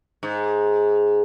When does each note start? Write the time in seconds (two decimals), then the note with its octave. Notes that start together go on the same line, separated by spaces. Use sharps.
0.23 G#2